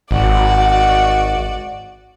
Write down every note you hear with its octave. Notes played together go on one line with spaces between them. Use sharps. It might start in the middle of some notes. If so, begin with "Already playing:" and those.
G#1 F#4 D5